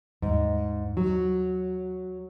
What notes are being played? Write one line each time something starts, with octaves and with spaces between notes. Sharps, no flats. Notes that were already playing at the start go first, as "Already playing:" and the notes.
D#2 G#2
F#3